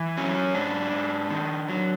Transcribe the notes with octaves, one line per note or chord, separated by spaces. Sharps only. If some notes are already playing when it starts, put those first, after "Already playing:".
Already playing: E3
F#3 C#4
G#2 D4
G#2
D#3
F#3